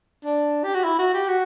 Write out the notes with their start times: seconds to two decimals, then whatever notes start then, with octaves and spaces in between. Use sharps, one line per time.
0.25 D4
0.64 G4
0.74 F#4
0.84 E4
0.99 F#4
1.14 G4
1.28 F#4